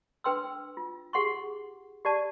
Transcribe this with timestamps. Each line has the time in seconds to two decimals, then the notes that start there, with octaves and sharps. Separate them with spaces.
0.24 D4 B4 G5 C6 E6
0.77 F4
1.13 G4 G#4 F#5 C6 C#6
2.05 G4 D5 A5